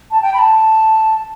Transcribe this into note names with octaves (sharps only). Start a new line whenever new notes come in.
A5
G5
B5
A5